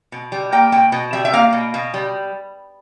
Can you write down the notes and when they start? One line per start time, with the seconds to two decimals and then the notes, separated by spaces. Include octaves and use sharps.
0.12 B2
0.32 G3
0.52 A#3 G5
0.72 B2 G5
0.92 B2
1.13 G3 E5
1.25 E5
1.33 A#3 F5
1.53 B2
1.74 B2
1.94 G3